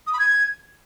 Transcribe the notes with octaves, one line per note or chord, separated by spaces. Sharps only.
D#6
B5
G#6